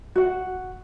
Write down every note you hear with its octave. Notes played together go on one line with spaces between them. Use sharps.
F#4 F#5